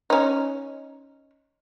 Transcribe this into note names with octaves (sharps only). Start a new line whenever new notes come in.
C#4 D#4